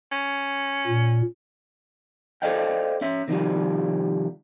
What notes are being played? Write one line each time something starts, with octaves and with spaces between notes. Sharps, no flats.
C#4
A#2
A4 C5 D5 D#5 F5 G5
C#4 E5
C3 D#3 F3 G3